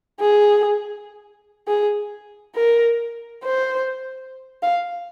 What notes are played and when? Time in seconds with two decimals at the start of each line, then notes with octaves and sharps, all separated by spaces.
0.20 G#4
1.67 G#4
2.56 A#4
3.44 C5
4.63 F5